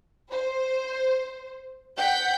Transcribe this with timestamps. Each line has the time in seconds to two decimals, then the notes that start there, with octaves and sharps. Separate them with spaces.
0.29 C5
1.98 F#5 G5 G6 B6